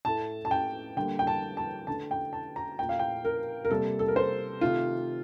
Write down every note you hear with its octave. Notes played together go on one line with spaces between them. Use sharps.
A2 A3 A5
A5
G5
D3 G3 A#3 G5
G5
A5
A5
D3 A3 A5
G5
A5
A#5
A#2 A3 G5
F5
G5
A#4
A#4
C3 G3 A#3 A4
A4
A#4
C5
C3 D#3 A3 F4